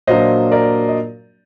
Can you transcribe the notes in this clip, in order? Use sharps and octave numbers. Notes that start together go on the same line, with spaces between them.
A#2 F#3 A#3 D4 C5 D#5
A#4 D5
D#5